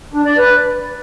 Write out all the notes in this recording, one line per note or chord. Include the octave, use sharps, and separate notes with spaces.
D4
D5
B4